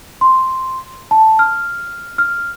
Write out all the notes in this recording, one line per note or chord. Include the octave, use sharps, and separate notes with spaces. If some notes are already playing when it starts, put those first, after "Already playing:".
C6
A5
F6
F6